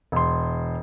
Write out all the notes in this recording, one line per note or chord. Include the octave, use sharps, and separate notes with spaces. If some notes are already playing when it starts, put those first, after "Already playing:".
E1 C6